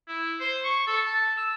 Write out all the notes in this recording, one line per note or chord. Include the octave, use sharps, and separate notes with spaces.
E4
C5
C#6
A4
A5
E6